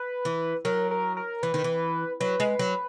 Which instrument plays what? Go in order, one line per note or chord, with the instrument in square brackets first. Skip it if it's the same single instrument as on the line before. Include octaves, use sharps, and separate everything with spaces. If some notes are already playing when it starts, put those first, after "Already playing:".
Already playing: [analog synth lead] B4
[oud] E3
[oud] F#3 [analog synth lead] A#4
[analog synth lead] A#4
A#4
[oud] E3 [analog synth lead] B4
[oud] D#3
E3
[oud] F#3 [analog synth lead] B4
[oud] G#3
F#3